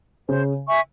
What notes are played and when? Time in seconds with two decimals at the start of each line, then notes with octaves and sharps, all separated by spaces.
0.28 C#3 C5
0.67 E5 G#5 C#6